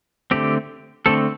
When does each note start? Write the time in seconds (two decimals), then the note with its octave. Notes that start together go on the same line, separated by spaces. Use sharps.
0.31 D3 A3 C4 G4
1.06 D3 A3 C4 A4